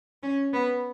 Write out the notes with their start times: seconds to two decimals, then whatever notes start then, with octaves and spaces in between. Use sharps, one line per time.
0.23 C#4
0.53 B3